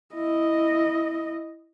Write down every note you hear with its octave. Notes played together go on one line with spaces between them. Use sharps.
E4 D#5